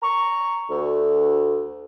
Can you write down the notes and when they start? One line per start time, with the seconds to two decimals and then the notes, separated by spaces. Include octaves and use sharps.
0.01 A#5 C#6
0.69 D2